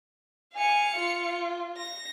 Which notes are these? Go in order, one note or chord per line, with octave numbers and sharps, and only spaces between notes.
F5 G#5 C#7
F4
A#6